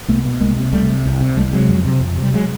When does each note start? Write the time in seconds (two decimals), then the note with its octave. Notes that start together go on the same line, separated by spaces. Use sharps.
0.08 C2 A3 B3
0.25 B2
0.40 C2 G#3 A#3
0.56 C3
0.72 C2 G3 A3
0.90 C3
1.06 C2
1.21 C3
1.37 C2 G3 A3
1.53 C3 F#3 G#3
1.69 F2
1.85 C3
2.01 F2
2.17 C3
2.22 G3
2.34 F#3 G#3